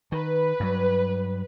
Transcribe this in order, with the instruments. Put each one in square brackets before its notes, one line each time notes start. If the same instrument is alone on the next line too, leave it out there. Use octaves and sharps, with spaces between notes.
[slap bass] D#3 [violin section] B4
[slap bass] G2 F#3